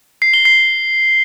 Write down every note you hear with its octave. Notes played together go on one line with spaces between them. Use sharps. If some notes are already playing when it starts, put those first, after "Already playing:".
C7
G7
C7